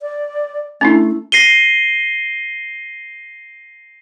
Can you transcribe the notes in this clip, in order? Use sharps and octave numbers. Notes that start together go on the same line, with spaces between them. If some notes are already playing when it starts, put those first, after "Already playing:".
D5
A3 C#4 D4 E4
A#6 C7 D#7 G7